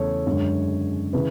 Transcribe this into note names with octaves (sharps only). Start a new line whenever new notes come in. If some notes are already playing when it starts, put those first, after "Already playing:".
Already playing: E2 C#3 E3 A3 A4 C#5
F#2 D3 G#3
C#3 E3 B4